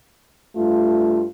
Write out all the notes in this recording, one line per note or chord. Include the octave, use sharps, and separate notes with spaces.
G2 A3 F4